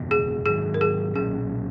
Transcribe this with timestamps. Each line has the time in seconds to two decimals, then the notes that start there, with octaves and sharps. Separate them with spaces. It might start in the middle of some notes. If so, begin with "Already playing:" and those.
Already playing: F#1 E2 B2
0.11 G#4
0.46 G#2 D#3 F#3 G#4
0.74 A#4
0.81 G#4
1.15 B1 A#2 F#3 C#4 G#4